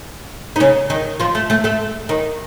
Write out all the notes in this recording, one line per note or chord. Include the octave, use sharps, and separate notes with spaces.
D#4
C#3 C#4
D#3 D#4
F3 F4
A3 A4
A3 A4
A3 A4
D#3 D#4